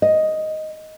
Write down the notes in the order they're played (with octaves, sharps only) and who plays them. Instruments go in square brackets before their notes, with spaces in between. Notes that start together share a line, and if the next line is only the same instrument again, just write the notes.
[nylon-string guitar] D#5